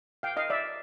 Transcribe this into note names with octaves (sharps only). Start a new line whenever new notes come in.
F5 G5
D#5 F5
D5 E5